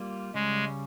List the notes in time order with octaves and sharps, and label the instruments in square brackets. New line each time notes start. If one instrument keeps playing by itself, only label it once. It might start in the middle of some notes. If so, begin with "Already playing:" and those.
Already playing: [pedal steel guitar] G3 A#3 F4
[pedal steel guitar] C#3 G3 C#4 [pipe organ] G#3